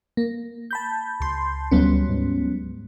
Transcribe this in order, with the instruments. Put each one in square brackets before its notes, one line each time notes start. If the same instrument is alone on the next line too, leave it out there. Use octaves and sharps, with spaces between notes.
[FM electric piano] A#3
A5 B5 G6
[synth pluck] C#2 C6
[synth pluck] D2 G3 [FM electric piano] F#3 B3 C#4
[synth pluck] G#2